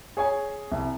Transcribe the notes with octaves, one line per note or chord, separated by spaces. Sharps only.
G#4 C#5 G#5
C2